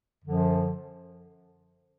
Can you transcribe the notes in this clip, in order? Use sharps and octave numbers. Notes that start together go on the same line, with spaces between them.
F#2 D3 F3